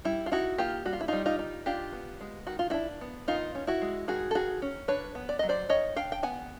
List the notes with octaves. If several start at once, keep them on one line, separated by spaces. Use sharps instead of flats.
G3 E4
F4
D#4 E4 F#4
A#3 F4 G4
G3 F#4
F4
E4
G3 D#4 F4
D#4 F4
D#4
D4 F4 G4
B3
G#3
D#3 F#4
F4
D4 E4 F#4
B3
D#3 D#4 F4
C#4
E4 F#4
G#3
D#3 F#4 G#4
A4
D#3 F#4 G#4
C#4
D4 B4 C#5
B3
D5
F#3 D#5
C5 D5
D#3 C#5 D#5
D4 F5 G5
G5
B3 F#5 G#5